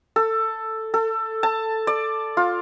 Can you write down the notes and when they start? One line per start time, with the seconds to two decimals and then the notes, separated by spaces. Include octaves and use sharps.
0.16 A4
0.94 A4
1.43 A5
1.87 D5
2.37 F4